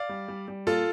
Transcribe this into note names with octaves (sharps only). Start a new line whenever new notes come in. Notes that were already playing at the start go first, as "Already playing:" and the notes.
Already playing: D5 F5
G3
G3
G3
A#2 F4 A4